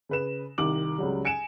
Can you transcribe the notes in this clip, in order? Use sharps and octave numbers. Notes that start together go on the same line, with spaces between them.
C#3 B4 E7
C2 D#3 D6 F#7
C#2 F#3 G3
G#5 C#7 D7 E7